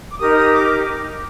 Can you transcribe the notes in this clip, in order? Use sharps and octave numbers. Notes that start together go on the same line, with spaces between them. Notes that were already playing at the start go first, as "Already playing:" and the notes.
D6
D#4 G4 A#4 D#6
D#6
D6